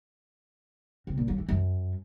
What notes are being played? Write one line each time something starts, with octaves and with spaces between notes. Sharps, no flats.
C3
A#2
F#3
E3
F#2